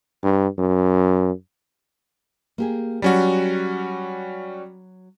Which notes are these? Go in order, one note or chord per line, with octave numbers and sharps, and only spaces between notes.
G2
F#2
A#3 G4 G#4
F#3 G3 C#4 F#4